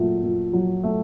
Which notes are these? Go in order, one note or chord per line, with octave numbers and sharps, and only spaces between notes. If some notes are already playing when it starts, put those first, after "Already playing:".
Already playing: A#2 F#3 A3
A#2
F#3
A3